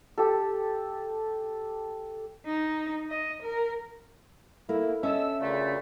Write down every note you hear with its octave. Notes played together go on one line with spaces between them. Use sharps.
G4 A4
D#4
D#5
A#4
A#3 E4 A4
C#4 A4 D#5 E5 E6
D2 A#2 C#3 A3